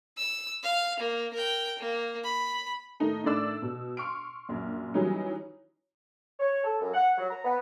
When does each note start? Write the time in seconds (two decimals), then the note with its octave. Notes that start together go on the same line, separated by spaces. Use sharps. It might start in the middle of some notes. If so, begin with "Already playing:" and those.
0.17 E6
0.63 F5
0.99 A#3
1.34 A#4 G5
1.79 A#3
2.24 B5
3.00 A2 D#3 D#4 A4
3.24 A2 D#3 D4 D5 E6
3.62 B2
3.97 C6 C#6 F6 D7
4.49 A#1 F#2
4.94 D#3 E3 F#3 G3 C#4 D#4
6.40 C#5
6.64 A4
6.81 F#2
6.94 F#5
7.18 F#3
7.31 A#5
7.45 B3